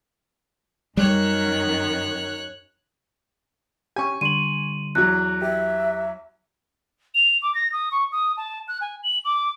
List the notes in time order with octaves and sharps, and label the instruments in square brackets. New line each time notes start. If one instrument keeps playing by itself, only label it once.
[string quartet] F#2 D#3 [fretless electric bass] G3 [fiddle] C#5 F#6
[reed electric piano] C#4 G4 [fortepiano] G#5 C#6
[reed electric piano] D3 G3 C6 [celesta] D#7 F#7
[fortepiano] E2 F#3 [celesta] F#6
[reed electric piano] G4 [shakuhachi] E5
[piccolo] F7
D6
A#6
D#6
C#6
D#6
A5
F#6
G#5
F#7
D6